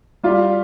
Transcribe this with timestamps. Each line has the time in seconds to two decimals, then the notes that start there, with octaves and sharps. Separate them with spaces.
0.24 G3 F4 G4